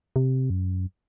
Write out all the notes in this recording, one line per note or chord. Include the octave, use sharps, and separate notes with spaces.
C3
F#2